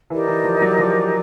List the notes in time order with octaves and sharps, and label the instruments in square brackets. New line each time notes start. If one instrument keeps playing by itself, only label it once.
[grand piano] E3 [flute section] D#4 G4 A#4 D5
[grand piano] E3
F3
F#3
F3